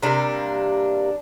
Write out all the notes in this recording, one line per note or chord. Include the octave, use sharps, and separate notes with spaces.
C3 G3 A#3 D4